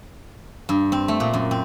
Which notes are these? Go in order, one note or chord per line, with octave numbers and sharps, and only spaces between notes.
G2
C4
A3
A#2
F#2
C4